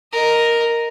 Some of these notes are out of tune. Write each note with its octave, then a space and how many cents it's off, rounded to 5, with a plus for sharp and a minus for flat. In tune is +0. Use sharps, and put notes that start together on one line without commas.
A#4 +0 D#5 +0